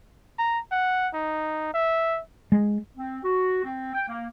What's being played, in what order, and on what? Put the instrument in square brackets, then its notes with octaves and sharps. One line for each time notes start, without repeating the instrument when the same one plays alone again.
[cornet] A#5
F#5
D#4
E5
[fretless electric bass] G#3
[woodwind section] C4
F#4
C4
G5
A#3